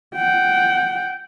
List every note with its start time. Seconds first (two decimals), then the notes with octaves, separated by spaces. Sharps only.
0.15 F#5 G5